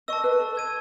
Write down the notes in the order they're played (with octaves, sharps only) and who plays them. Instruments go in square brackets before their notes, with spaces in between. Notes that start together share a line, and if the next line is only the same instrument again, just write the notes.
[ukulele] D#5 [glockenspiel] A5 C#6 E6
[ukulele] B4
A4
[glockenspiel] C#6 E6 G#6 D#7